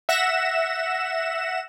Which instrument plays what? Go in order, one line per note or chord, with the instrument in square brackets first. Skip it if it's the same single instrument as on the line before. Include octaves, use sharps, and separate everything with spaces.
[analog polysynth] E5 F#5 A#6 E7